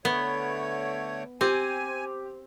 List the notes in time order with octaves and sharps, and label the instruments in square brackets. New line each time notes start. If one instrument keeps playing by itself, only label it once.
[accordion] D3 A3 C#5 [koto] B3
[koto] C4 [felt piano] G4 [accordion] G#5